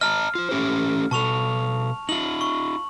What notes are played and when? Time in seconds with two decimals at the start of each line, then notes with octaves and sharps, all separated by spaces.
0.01 D#5 A5 A#5 F6
0.35 F4 C5
0.51 A3 C#4 G4
1.11 B2 A4 A5 C#6 F7
2.09 D#4 F4 F#7
2.41 C#6